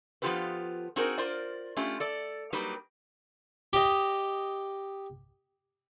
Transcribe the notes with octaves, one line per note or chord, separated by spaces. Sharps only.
F3 B3 F4 G4 A4 B4
C4 D#4 F#4 G#4 A#4 C5
F4 A#4 C5 D5
A3 C#4 F4 G4
A4 D5
F#3 G3 A#3 D#4 G4 B4
G4 D#5